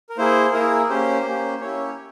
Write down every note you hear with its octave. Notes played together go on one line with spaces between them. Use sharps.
A#4
A#3 E4 G#4 C5
A#3 E4 G#4 A#4
A#3 C#4 G4 C5
A#3 C#4 G4
A#3 C#4 E4 G4 C#5